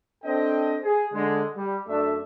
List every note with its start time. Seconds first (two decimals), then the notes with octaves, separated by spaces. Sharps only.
0.23 C4 D4 A4 D#5 G5
0.84 G#4
1.14 D3 G#3
1.56 G3
1.88 F#2 A3 D4 E5